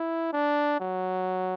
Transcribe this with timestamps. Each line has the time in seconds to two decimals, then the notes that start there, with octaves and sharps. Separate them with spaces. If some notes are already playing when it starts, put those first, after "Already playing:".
Already playing: E4
0.33 D4
0.80 F#3